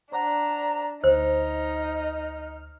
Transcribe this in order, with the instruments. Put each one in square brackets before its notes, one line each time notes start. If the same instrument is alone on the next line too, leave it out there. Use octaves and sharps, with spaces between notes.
[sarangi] D4 [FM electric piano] C5 D5 F#5 [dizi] A#5
[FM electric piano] D2 [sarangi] D#4 [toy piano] C5 [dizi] F6